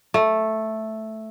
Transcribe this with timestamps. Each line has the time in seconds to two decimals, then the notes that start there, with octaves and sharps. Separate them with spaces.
0.14 A3